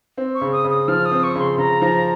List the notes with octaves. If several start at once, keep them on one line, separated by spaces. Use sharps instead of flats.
C4
C#6
C#3
D#6
C#3
D#6
F3 F6
D#6
C4
C#6
C#3 C6
C#3 A#5
F3